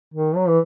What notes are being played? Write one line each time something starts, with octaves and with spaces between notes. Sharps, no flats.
D#3
F#3
E3